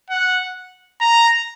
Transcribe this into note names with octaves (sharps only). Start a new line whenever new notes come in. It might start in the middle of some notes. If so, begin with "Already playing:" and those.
F#5
A#5